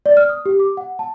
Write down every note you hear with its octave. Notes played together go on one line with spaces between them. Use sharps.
D5
F6
D#6
G4
D6
F#5
A5